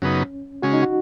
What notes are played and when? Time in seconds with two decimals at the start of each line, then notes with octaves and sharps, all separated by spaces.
0.02 F#2 C#3 B3 C#4 D#4
0.62 C#3 G#3 C#4 F#4
0.73 D#4
0.83 F#4